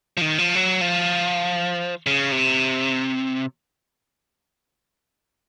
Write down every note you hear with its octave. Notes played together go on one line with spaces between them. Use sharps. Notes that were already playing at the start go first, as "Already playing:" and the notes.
F3
D#3
F3
F#3
F3
C#3
C3